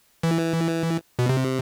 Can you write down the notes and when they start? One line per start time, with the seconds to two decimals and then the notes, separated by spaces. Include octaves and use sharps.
0.23 E3
1.19 B2
1.29 C3